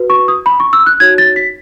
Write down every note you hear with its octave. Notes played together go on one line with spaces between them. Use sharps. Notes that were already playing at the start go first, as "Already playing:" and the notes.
Already playing: F#4 B4
C#6
D#6
B5
C#6
E6
F#6
D#4 F#4 C#5 G#6
A6
B6